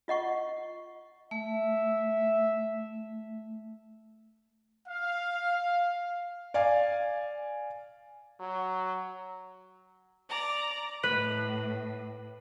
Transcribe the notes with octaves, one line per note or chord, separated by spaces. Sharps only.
F4 D#5 F#5 C#6
A3 E5
F5
D5 F5 G#5
F#3
D5 A#5
A2 B4